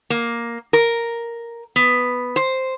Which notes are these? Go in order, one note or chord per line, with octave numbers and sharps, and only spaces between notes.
A#3
A#4
B3
C5